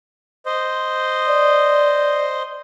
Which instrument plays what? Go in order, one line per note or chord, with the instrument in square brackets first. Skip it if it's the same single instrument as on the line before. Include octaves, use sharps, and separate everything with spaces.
[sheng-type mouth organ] C5 D#5
[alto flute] D5